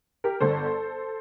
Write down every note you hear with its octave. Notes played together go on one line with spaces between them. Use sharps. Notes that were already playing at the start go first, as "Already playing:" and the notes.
G4 A#4
G1 G2 D3 A4 C5